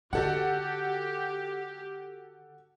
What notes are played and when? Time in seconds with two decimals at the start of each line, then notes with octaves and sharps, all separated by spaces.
0.13 D3 F#4 G4 A4 F#5